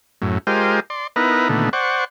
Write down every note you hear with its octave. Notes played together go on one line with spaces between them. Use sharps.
F#2 A2
G#3 F4 G4 A#4 C5 D#5
D5 C6
B3 D#4 E4 A#4 B4
A#2 D3 D#3 A3 B3
C5 D5 F#5 C#6